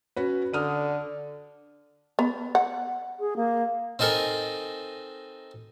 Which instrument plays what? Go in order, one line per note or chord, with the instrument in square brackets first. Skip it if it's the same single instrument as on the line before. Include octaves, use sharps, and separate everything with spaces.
[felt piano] C#4 F#4 B4
[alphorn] D3 [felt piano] D#6 F6 D#7
[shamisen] B3
F#5
[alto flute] G#4
A#3
[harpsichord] C4 D#4 A4 A#4 G#5